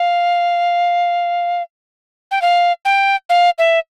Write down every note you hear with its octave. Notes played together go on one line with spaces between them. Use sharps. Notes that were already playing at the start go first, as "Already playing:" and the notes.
Already playing: F5
G5
F5
G5
F5
E5